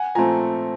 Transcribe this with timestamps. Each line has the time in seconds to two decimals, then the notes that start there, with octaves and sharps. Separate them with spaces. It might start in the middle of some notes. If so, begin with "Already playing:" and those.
Already playing: F#5 G#5
0.15 A#2 F3 A3 C4 G#5 A#5